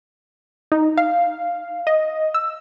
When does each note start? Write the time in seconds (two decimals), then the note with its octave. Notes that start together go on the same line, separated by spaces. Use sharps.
0.72 D#4
0.97 F5
1.87 D#5
2.34 E6